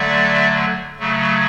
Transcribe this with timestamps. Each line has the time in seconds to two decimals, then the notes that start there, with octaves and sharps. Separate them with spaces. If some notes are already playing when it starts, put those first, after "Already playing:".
Already playing: D3 F#3 A3 D5 E5
0.99 C#3 F#3 A3